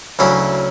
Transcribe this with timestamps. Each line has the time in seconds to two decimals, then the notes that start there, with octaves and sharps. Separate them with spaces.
0.19 D2 C#3 F#3 C#4 E4